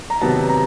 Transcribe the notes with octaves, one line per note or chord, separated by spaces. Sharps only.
A#5
C3 D#3 F#3 B3 A5
A#5